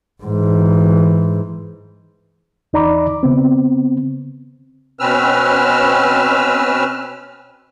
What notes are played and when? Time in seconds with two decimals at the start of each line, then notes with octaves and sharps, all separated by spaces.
0.23 G#2 E3
2.73 E2 D#4 D5 A#5 B5 D6
3.23 C#3 B3 C4
5.00 B2 C4 C#4 B4 E6 F6